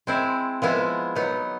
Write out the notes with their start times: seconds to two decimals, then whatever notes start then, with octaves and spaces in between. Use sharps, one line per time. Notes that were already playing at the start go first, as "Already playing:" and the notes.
0.07 G#3 C4 E4
0.62 F3 G#3 B3 E4
1.15 F#3 B3 D#4